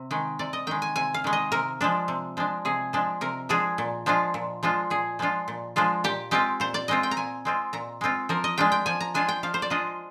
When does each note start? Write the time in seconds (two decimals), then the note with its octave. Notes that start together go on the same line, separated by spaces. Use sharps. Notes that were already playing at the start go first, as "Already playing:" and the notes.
Already playing: C3
0.11 D#3 G#3
0.39 C3 D5
0.53 D#5
0.67 D#3 G#3 G5
0.82 G#5
0.96 C3 G#5
1.14 F5
1.24 D#3 G#3
1.33 D#5
1.52 C3 A#4
1.81 F3 G#3 D4
2.08 C3
2.37 F3 G#3 D4
2.65 C3 G#4
2.93 F3 G#3 D4
3.21 C3 A#4
3.49 F3 G#3 D4 G#4
3.78 A#2
4.06 F3 G#3 D4 F4
4.34 A#2
4.63 F3 G#3 D4 F4
4.90 A#2 G#4
5.19 F3 G#3 D4 F4
5.48 A#2
5.76 F3 G#3 D4 F4
6.04 A#2 G4
6.31 G#3 C4 F4 G4
6.60 A#2 C5
6.74 D5
6.88 G#3 C4 F4 D#5
7.03 G5
7.11 A#5
7.17 A#2 G#5
7.45 G#3 C4 F4
7.73 A#2 A#5
8.01 G#3 C4 F4
8.29 F3 A#4
8.44 D#5
8.58 G#3 D4 F4 G5
8.72 G5
8.86 F3 G#5
9.00 A#5
9.14 G#3 D4 F4 G#5
9.29 G5
9.43 F3 F5
9.54 C5
9.62 D5
9.70 G#3 D4 F4 D#5